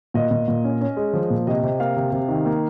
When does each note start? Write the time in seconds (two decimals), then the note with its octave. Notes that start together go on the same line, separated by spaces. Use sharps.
0.14 A#2 D#5
0.31 A#2
0.48 A#2
0.64 C#4
0.81 C#4
0.97 G#3
1.14 F3
1.30 A#2
1.47 C3 D#5
1.63 C3
1.80 A#3 F5
1.96 C3
2.12 C3
2.29 D#3
2.45 A#3